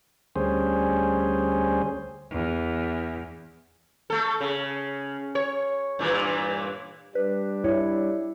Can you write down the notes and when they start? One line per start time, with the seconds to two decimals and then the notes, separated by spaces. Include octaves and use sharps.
0.36 D2 G3 C#4 G#4 C5
2.31 E2
4.10 A3 A4
4.41 C#3
5.35 C#5
5.99 G2 A#2 E3
7.15 G3 D4 B4
7.64 E4 C#5